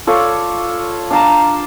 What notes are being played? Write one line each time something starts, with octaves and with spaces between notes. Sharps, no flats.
F4 A4 C#5 D5
D4 F5 A5 A#5